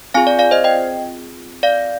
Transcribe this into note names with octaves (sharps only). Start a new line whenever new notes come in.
C4 F4 G#4 F5 G#5
D5
D5 F5
C5 D#5
D#5 G5
D5 F5